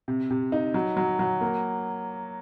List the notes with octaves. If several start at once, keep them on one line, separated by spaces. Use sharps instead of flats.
C3
C3
D#4
F#3
F#3
F#3
A#3